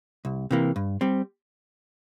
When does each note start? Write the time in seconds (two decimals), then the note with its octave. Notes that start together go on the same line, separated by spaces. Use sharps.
0.25 C2
0.51 C3 E3 A#3
0.76 G2
1.01 G3 C4